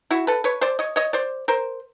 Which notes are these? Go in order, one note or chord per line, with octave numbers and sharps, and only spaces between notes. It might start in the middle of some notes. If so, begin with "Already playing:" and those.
E4 F#4
A4 B4
B4 C#5
C5 D5
C#5 D#5
C#5 D#5
C5 D5
A#4 C5